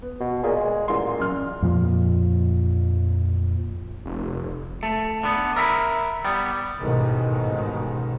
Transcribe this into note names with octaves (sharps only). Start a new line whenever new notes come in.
B3
B2
A#2 G#4 D#5
G#3
A1 A#2 G#4 C6
F#2 F6
F2 A#2 F3
F1
A3
D3 B3
A#4 E5 A#5 B5
G3 B3
A1 G#2 B2 D#3